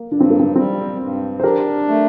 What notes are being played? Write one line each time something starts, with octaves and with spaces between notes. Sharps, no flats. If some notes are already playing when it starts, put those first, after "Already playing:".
Already playing: A#3
G2 D4
C4
A#3
C4
G3 C4
G2
C5
D4 G4 A#4
A3